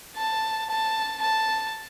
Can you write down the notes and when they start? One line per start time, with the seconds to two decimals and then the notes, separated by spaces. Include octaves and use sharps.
0.16 A5
0.70 A5
1.21 A5